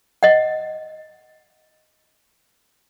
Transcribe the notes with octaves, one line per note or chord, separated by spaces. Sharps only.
D#5 F#5